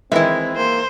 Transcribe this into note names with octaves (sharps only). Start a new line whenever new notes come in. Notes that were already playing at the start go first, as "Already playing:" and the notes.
D#3 E3 G#3 C4 E4 E5
A#3 C5